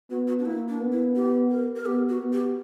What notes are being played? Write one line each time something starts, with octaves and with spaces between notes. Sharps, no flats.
B3 F#4
F#4
D4
A#3 E4
D4
B3
E4
G4
A#4
A#4
B3 G4
F#4
B3
G4